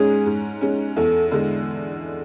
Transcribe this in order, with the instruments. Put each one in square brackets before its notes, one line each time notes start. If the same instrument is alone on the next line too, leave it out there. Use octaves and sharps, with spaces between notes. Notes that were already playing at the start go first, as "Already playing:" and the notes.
Already playing: [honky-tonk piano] G#2 G#3 C#4 [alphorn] G#4
[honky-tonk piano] G#2
G#3 C#4
[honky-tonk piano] E2 [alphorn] A4
[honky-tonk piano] D3 G#3